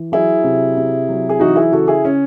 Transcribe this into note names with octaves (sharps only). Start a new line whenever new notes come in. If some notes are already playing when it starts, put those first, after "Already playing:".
Already playing: E3
F#3 E4 G#4
C3
C3
F#3
G#4
E3 D#4 F#4
E4 G#4
C#3 F#4 A4
E4 G#4
C#3 C#4